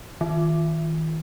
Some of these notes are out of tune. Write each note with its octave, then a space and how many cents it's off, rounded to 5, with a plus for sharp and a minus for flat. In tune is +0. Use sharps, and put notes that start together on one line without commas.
D#3 +40